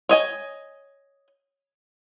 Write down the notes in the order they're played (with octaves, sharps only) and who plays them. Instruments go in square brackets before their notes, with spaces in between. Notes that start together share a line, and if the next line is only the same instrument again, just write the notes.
[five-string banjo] C#5 D#5 G#5